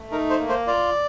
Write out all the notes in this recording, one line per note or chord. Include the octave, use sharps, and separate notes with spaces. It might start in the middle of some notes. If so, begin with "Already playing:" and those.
Already playing: A3
D#4 A#4
C5
A#3
C5
F4 D5